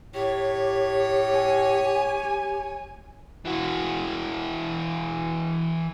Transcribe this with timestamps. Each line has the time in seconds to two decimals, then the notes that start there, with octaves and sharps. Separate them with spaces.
0.14 A2 G4 C#5
1.32 G#5
3.45 E3 F#4